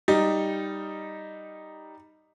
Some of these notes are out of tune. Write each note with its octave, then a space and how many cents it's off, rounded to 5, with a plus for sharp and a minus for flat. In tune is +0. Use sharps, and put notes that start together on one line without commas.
G3 +0 D#4 +0